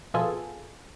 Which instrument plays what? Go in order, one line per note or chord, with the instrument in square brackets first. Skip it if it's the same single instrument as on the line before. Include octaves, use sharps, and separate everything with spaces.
[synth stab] B2 F3 B3 F4 G#4 A4